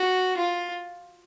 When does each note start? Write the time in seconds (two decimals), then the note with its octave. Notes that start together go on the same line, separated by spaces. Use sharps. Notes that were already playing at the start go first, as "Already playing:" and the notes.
Already playing: F#4
0.37 F4